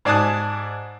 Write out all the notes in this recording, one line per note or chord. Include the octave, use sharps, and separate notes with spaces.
G#2 D5 G#5 A5 D#6 F#6